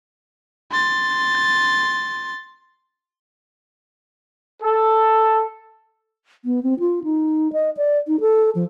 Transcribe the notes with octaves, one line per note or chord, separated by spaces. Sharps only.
C6 A6
A4
B3
C4
F4
D#4
D#5
D5
D#4
A4
F3